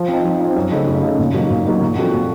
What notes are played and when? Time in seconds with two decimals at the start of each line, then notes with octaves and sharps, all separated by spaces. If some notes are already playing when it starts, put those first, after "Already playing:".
Already playing: F3
0.08 C4 D#4
0.24 F3
0.40 C4 D#4
0.56 F#2
0.72 C#3 A3 D#4
0.87 F#2
1.03 C#3 A3 D#4
1.19 A#2
1.34 F#3 A#3 D#4
1.50 A#2
1.66 F#3 A#3 D#4
1.82 A#2
1.97 F3 C4 F#4 A4
2.13 A#2